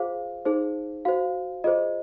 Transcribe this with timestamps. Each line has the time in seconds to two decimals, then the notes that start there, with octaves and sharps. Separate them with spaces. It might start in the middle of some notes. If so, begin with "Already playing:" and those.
Already playing: F4 G#4 C5 F5
0.45 D#4 G#4 C5
1.05 F#4 C5 F5
1.64 F4 G#4 C5 D#5